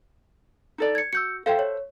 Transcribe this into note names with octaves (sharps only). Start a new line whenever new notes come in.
D#4 A4 D5
G#6 C#7
F#4 E6 G6 C#7
A4 C5 E5 F5 G5
C#5